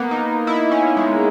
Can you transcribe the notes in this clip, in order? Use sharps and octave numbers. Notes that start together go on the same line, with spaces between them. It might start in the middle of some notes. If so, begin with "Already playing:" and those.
Already playing: A#3 B3
D#4
E4
C#4
G#3